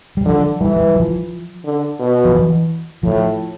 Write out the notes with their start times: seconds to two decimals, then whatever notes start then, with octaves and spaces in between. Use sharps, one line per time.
0.17 G3
0.26 D3 F3
0.61 E3 G3
0.76 G3
0.96 F3
1.65 D3
2.00 B2
2.25 F3
2.35 E3
3.03 A2 F3